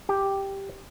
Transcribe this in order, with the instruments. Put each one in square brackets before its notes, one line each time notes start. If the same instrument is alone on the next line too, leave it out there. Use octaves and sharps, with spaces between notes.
[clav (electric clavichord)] G4